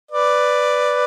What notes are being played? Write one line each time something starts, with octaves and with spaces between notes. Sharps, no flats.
B4 D5